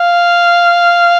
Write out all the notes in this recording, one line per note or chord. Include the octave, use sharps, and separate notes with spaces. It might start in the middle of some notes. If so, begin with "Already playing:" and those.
Already playing: F5